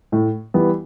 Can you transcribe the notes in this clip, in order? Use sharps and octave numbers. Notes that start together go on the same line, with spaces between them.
A2
E3 G3 B3